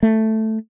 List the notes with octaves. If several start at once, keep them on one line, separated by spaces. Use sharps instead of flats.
A3